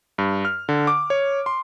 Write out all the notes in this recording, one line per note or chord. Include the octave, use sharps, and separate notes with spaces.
G2
F6
D3
D6
C#5
C6